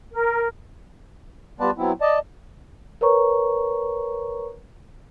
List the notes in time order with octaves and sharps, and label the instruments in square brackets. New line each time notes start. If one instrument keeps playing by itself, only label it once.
[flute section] A#4
[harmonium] G3 B3 F4 B4 D5 A5
F#3 B3 C4 E4
D5 D#5 A5
[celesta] A#4 B4 C#5 A#5 C#6